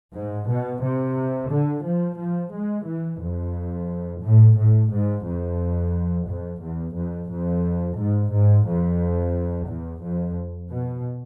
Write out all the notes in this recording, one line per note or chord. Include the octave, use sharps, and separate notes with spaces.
G#2
B2
C3
D3
F3
F3
G#3
E3
F2
A2
A2
G#2
F2
F2
E2
F2
F2
G#2
G#2
F2
E2
F2
B2